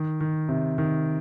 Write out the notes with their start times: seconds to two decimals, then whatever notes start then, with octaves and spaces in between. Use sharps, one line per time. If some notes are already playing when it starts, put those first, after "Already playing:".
Already playing: D#3
0.20 D#3
0.49 C3
0.78 D#3